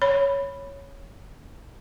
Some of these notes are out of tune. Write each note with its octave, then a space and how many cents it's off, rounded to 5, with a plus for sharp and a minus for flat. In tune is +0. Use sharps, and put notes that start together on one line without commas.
C#5 +0 B5 +0